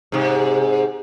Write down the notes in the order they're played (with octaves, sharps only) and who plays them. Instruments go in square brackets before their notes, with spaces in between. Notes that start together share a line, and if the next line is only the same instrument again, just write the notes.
[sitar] G#2 C3